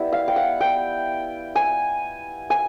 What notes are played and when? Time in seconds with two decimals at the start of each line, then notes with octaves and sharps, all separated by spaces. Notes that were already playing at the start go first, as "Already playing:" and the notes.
Already playing: G3 B3 E4
0.13 F5
0.28 G5
0.36 F#5
0.61 G5
1.56 G#5
2.50 G#5